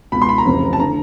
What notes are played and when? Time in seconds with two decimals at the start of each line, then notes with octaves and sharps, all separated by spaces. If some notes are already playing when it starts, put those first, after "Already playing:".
0.12 C#2 B2 B5
0.22 C6
0.29 B5
0.38 A#5
0.46 F1 F2 C#3 E3
0.73 A5
0.80 D3 A#5